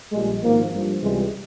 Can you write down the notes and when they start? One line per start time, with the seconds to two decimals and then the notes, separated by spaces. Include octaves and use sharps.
0.12 A#1 A#2 G3 G#3
0.42 G#1 G#2 F3 A#3
0.71 G2 F3
1.01 C#2 C3 E3 G3 G#3